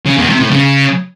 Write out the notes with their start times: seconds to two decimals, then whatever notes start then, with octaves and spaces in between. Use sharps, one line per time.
0.05 C#3
0.17 E2
0.28 C3
0.40 A2
0.51 C#3